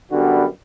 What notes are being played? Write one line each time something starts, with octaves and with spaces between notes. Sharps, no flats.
F#2 D3 G3 B3 F#4